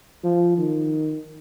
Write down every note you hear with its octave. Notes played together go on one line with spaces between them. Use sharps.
F3
D#3